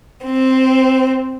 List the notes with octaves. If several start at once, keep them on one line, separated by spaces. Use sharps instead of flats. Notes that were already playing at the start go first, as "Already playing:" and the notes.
C4